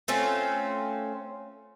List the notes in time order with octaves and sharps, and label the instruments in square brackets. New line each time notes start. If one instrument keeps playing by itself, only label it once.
[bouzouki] A3 C4 C#4 F4